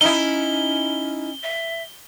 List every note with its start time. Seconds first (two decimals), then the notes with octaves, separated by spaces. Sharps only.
0.01 C#4 D#4 E4 G7
1.43 E5